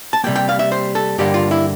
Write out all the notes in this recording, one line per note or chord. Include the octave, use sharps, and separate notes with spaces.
A5
C3 G3 A#3 G5
G5
F5
E5
C5
A4
G2 D3 G3 A#3 G4
F4
E4